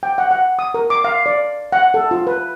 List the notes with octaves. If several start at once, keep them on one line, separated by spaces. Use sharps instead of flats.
G5
F#5
F#5
D#6
A#4
D6
F5
D5
F#5
A4
F4
B4